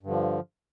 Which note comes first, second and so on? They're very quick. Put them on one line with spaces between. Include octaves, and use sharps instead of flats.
G2 D3 F3